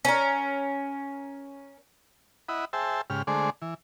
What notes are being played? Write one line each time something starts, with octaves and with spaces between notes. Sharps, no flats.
C#4 A#4
E4 D#5 F#5 B5
G#4 C5 E5 G5 A5
G#2 C#3 G4 F6
D3 G#3 A3 G#4 C5 D5
E3